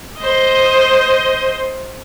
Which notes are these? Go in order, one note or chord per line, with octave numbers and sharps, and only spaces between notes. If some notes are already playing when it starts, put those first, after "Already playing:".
C5 D#5